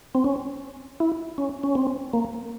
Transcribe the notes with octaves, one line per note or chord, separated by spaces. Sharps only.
C4
C#4
E4
C#4
C#4
C4
A#3